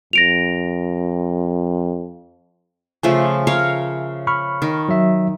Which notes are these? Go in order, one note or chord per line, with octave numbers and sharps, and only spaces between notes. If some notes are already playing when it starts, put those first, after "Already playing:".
F2 A#6 D7 F7
C#3 F3 A3 E5 G#5
A#4 C#5 F5
B5 C#6 F6
D#3
F#3 E5